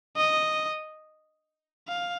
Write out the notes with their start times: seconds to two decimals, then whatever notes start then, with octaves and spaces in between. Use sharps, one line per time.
0.17 D#5
1.88 F5